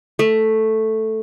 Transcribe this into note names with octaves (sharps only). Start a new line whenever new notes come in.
A3